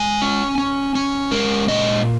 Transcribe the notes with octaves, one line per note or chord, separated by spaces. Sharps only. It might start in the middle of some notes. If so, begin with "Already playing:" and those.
Already playing: G#3 G#5
C#4
C#4
C#4
G#3 A#4
A#2 D#5